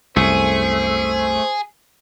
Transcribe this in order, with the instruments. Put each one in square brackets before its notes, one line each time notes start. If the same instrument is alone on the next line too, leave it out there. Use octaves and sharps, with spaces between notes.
[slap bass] C2 F#2 [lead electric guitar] A3 [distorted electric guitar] G#4 [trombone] C5